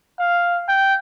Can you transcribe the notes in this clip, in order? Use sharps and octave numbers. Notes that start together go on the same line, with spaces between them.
F5
G5